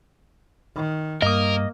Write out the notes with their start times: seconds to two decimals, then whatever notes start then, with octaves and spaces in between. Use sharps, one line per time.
0.75 D#3
1.22 G2 A#3 A#4 D#5 D#6